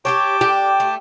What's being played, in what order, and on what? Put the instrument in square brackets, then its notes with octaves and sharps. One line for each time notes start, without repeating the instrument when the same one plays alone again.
[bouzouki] G4 A4 C#5 [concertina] G5 A5 D6
[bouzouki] D4 [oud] G4
[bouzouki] A3